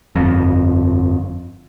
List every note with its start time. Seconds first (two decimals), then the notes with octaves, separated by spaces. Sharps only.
0.16 G1 F2